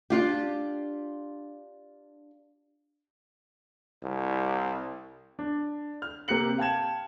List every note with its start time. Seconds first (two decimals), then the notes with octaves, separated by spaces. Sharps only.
0.10 D4 F4 G4
4.03 C2
5.39 D4
6.02 F6
6.28 C3 A#3 G4 F#6 C#7 F#7
6.58 F5 G5 A5 G#6 E7